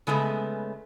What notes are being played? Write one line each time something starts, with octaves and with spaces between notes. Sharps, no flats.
C#3 G#3 A3 B3